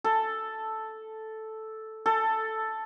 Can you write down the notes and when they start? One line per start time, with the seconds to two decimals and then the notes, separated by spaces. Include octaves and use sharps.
0.04 A4
2.06 A4